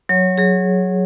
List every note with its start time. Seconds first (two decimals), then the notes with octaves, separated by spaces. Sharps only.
0.09 F#3 C#5
0.38 F#3 G#4